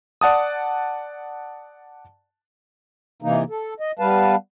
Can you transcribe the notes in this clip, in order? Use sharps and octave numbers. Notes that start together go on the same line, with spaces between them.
D5 F#5 A5 D#6
C3 E3 A#3 D#4
A4
D#5
G3 B3 B4 F5 A5